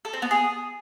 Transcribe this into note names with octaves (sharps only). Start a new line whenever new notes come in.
A4
C4
B3
G#4